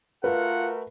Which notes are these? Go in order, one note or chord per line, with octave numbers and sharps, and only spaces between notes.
A3 F4 F#4 A#4 B4 F#5